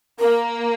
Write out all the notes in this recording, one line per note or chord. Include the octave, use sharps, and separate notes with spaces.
A#3 A#4